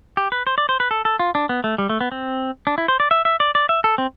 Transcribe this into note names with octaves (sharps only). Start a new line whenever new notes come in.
G4
B4
C5
D5
C5
B4
A4
A4
F4
D4
B3
A3
G3
A3
B3
C4
D4
E4
C5
D5
E5
E5
D5
D5
E5
A4
C4